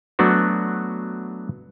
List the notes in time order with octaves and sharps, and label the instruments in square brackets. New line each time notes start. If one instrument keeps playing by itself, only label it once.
[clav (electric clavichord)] F#3 A3 B3 D4 F#4